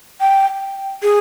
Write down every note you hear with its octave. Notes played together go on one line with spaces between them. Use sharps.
G5
G#4